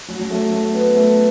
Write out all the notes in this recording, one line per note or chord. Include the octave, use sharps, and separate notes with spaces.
F#3
F#3
A3
A3
B3
B3
A3